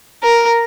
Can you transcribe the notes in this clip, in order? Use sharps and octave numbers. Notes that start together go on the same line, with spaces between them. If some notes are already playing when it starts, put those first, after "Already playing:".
A#4